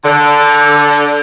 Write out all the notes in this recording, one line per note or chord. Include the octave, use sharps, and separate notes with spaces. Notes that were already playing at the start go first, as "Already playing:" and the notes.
D3